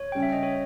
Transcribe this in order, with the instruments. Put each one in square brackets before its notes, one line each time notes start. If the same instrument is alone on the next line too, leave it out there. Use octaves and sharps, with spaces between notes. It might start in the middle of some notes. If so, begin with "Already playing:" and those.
Already playing: [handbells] C#5
[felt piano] C#3 G3 C#4 [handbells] G5
[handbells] E5
D#5
C#5